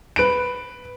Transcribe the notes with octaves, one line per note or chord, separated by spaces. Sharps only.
B4 D7